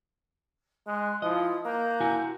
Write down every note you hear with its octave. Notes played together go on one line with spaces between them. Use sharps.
G#3 C6 F#6
F3 E4 F4 D#5 D#6
A#3 A#5 F#6 G6
E4 F#4 G#5